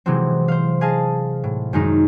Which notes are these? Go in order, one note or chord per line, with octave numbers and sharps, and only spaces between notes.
C3 E3 F#3 G#3 C4
C5 F5
G#4 D#5 F5 G#5 A5
A2
F#2 D#3 G#3 D#4